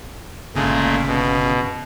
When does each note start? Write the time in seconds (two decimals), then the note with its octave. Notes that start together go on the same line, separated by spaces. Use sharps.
0.55 G1 A#2 C#3 G#3 A3
1.07 B2